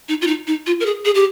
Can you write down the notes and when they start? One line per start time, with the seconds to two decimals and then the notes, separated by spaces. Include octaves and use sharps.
0.09 D#4
0.22 F4
0.27 D#4
0.47 D#4
0.67 F4
0.80 A#4
0.86 G#4
1.05 G#4
1.15 G4